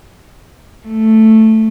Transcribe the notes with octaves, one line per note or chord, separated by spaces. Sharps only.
A3